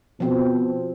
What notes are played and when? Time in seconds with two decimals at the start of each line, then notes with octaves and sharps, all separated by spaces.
0.20 B2 F3 C4